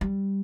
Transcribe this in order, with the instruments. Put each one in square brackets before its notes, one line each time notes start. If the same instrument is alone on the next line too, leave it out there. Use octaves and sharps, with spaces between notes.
[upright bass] G3